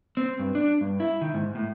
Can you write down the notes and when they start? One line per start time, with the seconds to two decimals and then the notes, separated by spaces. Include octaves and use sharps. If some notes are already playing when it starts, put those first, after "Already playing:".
0.17 C4
0.39 G2
0.55 D4
0.81 G2
1.00 E4
1.21 D#3
1.34 G#2
1.55 A2